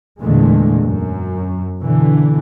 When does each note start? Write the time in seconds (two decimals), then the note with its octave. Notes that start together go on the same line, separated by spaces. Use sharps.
0.19 E2 A#2 D3 G#3 A3
0.84 F#2
1.80 B2 D3 E3